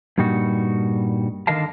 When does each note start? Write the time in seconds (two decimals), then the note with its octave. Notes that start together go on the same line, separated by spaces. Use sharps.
0.18 G2 A#2 G3 D#4 F#4
1.47 D3 D#3 A#4 D#5 F5 A5